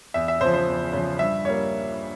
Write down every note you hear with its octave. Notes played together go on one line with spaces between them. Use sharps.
E2 E5
E5
C#3 F3 C5
C5
E2
C#3 F3
G2 E5
G3 A#3 C#5